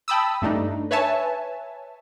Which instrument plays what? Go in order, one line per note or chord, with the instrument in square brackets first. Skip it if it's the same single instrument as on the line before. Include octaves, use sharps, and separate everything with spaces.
[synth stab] G5 A5 B5 D#6 E6
G2 A3 D4 D#4
B4 C#5 E5 G#5 A5